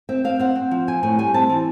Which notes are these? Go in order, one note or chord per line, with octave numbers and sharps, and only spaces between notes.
C4 E5
C4 F5
C4 F#5
C4
F3
C4 G#5
A2 G#5
G3 G#5
C4 A5
E3